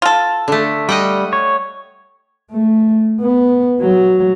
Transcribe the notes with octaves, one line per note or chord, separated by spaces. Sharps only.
F4 A4
D3 A3
G3 D#5 F#5 G5
C#5
A3
B3
F#3